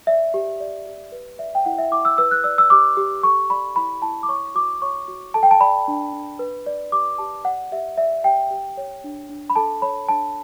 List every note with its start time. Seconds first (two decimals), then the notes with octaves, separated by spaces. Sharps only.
0.07 D5 E5
0.34 G4
0.60 D5
0.86 G4
1.12 B4
1.39 D5 E5
1.55 G5
1.65 E4 F#5
1.78 E5
1.91 E4 D6
2.05 E6
2.18 B4 E6
2.31 F#6
2.44 D5 E6
2.58 E6
2.70 G4 D6
2.97 G4
3.23 A4 C#6
3.50 D5 B5
3.76 E4 B5
4.02 E4 A5
4.23 D6
4.29 C#5 C#6
4.55 F#4 D6
4.82 C#5 C#6
5.08 F#4
5.34 A4 A5
5.43 G5
5.51 A5
5.60 D5 B5
5.88 D4
6.13 D4
6.39 B4
6.66 D5
6.92 G4 D6
7.18 G4 A5
7.45 D5 F#5
7.72 G4 E5
7.97 D5 E5
8.24 G4 G5
8.51 G4
8.77 C#5
9.04 D4
9.29 D4
9.50 B5
9.56 A4 A5
9.82 C#5 B5
10.09 D4 A5